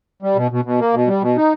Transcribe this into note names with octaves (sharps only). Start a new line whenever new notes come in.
G3
B2
B2
B2
A#3
B2
G3
B2
D#4